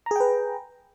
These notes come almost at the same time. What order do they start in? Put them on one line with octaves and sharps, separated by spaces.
A#5 G#4 G5 B4